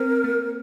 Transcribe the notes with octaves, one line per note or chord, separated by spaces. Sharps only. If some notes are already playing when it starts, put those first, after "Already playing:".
Already playing: C4 A#4
A#3